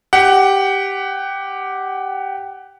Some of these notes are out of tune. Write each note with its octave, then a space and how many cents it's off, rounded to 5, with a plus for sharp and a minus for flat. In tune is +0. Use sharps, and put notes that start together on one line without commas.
G4 +0 F#5 +20